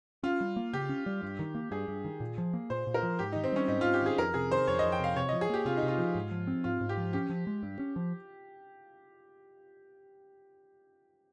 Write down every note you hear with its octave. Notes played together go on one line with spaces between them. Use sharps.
C#4 F4
G3
A#3
C#3 G4
C#4
G3
G2
D#3
A#3
G2 G#4
G2
D#3
A#2
F3
A#3
A#2 C5
A#2
A#4
F3
G#2 G4
D#3 D#4
C4
G3 C#4
G#2 D#4
G#2 F4
G4
D#3 G#4
F2 A#4
C3 G#4
D#3 C5
F2 C#5
F2 D#5
G5
C3 F5
C3 C#5
F3 D#5
G#4
A#3 G4
C3 F4
D#4
C3
F4
F3
G#2
F3
C4
G#2 F4
G#2
G4
F3
C#4 G4
F3
G#3
G2
C#4
F3